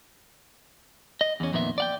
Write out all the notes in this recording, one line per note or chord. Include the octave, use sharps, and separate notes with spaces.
D#5
E2 C#4
F2 A#2 D#3 B3 E5
D5 F#5 G5